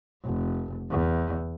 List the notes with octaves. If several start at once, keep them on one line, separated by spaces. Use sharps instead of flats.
F1
E2